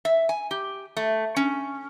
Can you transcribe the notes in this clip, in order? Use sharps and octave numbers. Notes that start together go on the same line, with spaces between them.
E5
G#5
G4
A3
C#4